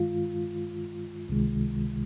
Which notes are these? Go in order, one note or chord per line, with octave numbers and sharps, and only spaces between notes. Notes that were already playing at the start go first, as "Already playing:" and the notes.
Already playing: G2 D#3 G#3 F4
C#2 C3 D#3 G#3